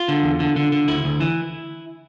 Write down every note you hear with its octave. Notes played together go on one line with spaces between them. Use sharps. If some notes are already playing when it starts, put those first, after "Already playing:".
Already playing: F4
D3
E2
D3
D3
D3
D2 E4
D2
E3